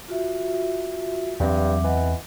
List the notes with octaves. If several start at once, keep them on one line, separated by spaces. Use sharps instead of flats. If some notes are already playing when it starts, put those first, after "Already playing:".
F4 F#4 E5
E2 G2 F#3 C4 E5 D6
E3 D#5 F#5